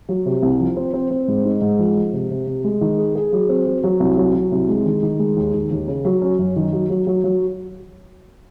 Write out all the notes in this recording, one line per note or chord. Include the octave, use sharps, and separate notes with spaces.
F#3
C3
C2
F3
C4
C4
C4
G#2
D#4
G#2
F3
F3
C3
C3
C3
G#3
D#3
G#4
G#4
F#3
C4
F#3
F#3
C2
F#3
F#3
C2
G#3
D#3
D#3
G#3
D#2
D#2
D#2
C#3
F#3
C#4
F#2
D#3
F#3
F#3
F#3
F#3